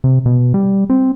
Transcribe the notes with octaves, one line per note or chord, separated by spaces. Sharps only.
C3
B2
G3
C4